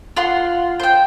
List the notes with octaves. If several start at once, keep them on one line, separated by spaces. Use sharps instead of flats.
F4 F#5 C6
C5 G5